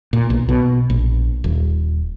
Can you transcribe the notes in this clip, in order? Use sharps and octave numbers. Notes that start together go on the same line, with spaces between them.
A#2
B1
B2
A#1
D#1